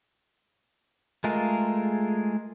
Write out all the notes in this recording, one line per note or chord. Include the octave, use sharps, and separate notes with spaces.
G#3 A3 F4 G#4 A#4